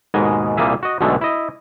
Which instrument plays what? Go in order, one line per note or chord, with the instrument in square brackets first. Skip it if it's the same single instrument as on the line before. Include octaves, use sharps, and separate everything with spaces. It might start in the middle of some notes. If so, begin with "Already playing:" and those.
[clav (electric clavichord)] D#2 G#2 B2 G#3 D#5 G#5
C2 A#2 G3 A#3 G#4 E5
F#4 D#5
B1 B2 D3 G#3 A3
E4 D#5